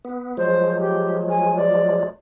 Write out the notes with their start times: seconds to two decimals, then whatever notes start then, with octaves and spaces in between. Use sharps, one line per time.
0.05 B3
0.37 F3 F#3 G#3 C5
0.79 G4
1.30 G#5
1.57 D5